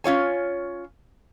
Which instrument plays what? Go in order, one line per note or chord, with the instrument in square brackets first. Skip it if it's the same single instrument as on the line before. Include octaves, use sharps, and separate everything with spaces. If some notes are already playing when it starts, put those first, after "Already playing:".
[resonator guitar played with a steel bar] C#4 F4 C#5 G#5